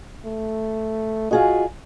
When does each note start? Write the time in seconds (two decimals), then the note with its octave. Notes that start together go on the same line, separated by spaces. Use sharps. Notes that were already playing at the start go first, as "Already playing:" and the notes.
0.25 A3
1.31 F4 F#4 G#4 D#5